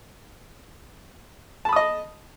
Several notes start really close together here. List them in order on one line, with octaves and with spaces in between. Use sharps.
A5 B5 D#6 D#5